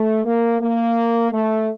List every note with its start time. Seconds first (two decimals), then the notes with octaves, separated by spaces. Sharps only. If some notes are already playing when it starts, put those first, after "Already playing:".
Already playing: A3
0.25 A#3
0.61 A#3
1.32 A3